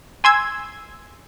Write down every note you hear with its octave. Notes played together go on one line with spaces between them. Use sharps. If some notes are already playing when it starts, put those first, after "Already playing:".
G#5 C6 E6 G#6